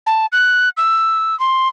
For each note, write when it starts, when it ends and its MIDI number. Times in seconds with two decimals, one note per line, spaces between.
0.06 0.26 81
0.32 0.69 90
0.77 1.37 88
1.39 1.68 84